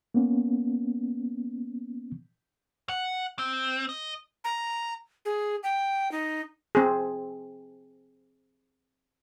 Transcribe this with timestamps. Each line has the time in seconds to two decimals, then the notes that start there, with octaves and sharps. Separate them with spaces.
0.14 A#3 B3 C#4
2.89 F#5
3.39 C4
3.89 D#5
4.44 A#5
5.25 G#4
5.63 G5
6.12 D#4
6.75 C4 G#4